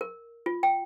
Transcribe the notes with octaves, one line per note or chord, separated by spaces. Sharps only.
A#4
F4
G5